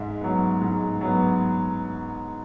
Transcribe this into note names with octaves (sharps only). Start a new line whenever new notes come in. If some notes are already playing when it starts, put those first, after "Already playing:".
Already playing: G#2 E5
F#3 B3
G#2
F#3 B3